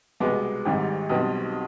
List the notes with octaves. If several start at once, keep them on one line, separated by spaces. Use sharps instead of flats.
C2 B2 G#3 B3 D6
G#1 G#2 G3
B1 B2 G3 C4 D#6